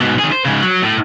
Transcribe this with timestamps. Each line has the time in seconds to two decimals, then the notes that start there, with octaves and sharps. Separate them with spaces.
0.01 G#2 B2
0.19 D#3 G#4
0.32 C5
0.45 G#2 C#3
0.61 F#3
0.83 A2